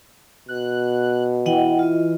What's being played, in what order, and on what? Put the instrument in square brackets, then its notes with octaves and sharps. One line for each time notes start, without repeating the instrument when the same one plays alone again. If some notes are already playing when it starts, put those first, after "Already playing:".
[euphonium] B2 [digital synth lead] F#6
[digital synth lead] E3 [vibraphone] D#5 F#5 G5
[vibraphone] F4 D#5